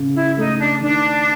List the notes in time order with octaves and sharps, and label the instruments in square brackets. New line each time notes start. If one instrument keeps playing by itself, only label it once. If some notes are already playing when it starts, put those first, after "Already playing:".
Already playing: [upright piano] C#3 C#4
[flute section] E4
[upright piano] A3 [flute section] D#4
[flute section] D4
[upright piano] D#3 [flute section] D4